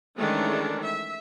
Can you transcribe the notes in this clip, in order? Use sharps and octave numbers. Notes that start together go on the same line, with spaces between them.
D#3 E3 G#3 A3 C#4 D4
E5